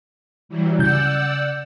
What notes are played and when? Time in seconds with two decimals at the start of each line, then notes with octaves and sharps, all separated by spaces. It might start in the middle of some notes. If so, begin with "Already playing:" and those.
0.49 E3 F#3 G3
0.79 C#3 D5 F#5 E6 G6